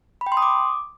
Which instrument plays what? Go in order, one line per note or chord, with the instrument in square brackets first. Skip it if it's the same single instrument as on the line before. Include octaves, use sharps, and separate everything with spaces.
[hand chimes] B5
G5
C6
D#6
D6